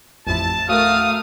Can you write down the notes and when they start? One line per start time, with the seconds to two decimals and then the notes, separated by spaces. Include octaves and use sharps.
0.27 A1 F2 E4 A5
0.69 A3 F#4 A#4 F5 D#6